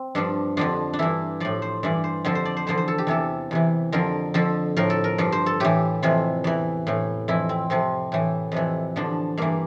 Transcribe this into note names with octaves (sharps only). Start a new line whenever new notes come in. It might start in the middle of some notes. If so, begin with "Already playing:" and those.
Already playing: C4
G2 F3 D4
F2 D3 F3 D4
D4
G2 E3 E4
A2 F3 D5
C5
G2 E3 D5
C5
F2 D3 F3 A4
C5
D5
C5
E2 D3 F3 C5
C5
A4
G4
E2 C3 E3 A4
E2 C3 E3
F2 D3 F3 A#4
F2 D3 F3 A4
A2 F3 A#4
A4
A#4
G2 F3
C5
A4
A2 E3 G4
F2 C3 E3 F4
E2 E3
A2 E3
F2 E3 E4
C4
F2 C3 F3 C4
A2 E3
F2 C3 E3
E2 D3 F3 D4
G2 E3 A#3